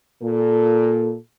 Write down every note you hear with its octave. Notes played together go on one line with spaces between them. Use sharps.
A#2 A4